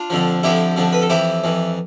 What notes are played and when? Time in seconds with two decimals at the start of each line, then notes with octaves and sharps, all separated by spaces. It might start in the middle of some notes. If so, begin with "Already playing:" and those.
Already playing: D4 F4
0.10 F2 D3 F3
0.43 F2 D3 F3 E4 G4
0.76 F2 D3 F3
0.93 B4
1.01 A4
1.10 F2 E3 E4 G4
1.44 F2 E3